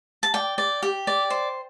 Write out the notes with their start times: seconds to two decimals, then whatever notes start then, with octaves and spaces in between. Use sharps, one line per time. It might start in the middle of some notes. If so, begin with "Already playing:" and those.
0.23 A5
0.34 D5 G5
0.58 D5
0.82 G4
1.07 D5
1.30 C5